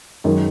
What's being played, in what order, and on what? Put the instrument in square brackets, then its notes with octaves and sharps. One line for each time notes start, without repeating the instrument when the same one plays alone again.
[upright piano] F#2 D#3 G#3